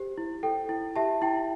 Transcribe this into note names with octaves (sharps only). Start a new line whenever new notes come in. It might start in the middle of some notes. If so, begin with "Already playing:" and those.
Already playing: G4 C5
E4
A4 G5
E4
G4 E5 A5
E4 G5